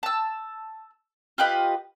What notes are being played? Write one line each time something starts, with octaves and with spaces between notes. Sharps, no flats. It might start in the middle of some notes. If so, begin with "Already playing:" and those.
A5 E6
F4 G4 B4 D#5